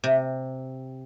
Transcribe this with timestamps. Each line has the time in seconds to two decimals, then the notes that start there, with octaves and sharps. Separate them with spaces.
0.04 C3